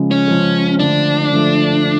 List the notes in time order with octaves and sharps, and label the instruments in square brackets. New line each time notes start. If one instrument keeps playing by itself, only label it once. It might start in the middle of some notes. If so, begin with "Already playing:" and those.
Already playing: [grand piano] C#3 F3 G#3
[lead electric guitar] C#4
[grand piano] C#3 F3 G#3
[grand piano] D3 F3 A3 [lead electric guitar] D4
[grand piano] D3 F3 A3